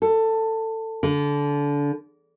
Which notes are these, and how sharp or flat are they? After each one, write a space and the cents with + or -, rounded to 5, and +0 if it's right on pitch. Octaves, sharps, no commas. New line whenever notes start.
A4 +20
D3 -25